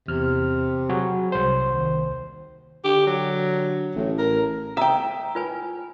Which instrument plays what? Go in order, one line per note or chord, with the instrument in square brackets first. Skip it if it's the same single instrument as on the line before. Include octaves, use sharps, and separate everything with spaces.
[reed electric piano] E2 F6 [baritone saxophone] C3
[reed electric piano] F#3 F#4 G#4
C2 C5
[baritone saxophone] D#2
[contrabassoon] D3 [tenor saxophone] G4
[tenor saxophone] F#3
[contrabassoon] A1 [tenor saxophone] A2
[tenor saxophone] A#4
[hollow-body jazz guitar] E5 G5 [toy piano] A#5 D#6
[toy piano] F4 B4 G#5